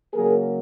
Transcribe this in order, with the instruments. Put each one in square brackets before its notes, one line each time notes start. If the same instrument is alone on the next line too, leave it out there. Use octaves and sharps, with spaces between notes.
[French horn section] C#3 F#3 A#3 G#4 A#4